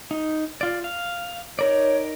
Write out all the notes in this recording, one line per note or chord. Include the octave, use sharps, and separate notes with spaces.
D#4
F4 D5
F5
D#4 A#4 C#5 D5